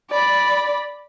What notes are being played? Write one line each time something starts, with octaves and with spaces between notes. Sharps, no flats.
D5 B5